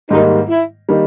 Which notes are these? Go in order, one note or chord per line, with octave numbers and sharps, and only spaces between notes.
G#2 D#3 G3 A#3 D#4
E4
D#3 G3 A#3